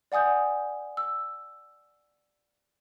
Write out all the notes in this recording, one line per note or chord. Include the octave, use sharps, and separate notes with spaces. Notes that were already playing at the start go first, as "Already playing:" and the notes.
D5 F#5 G#5 D#6 G6
E6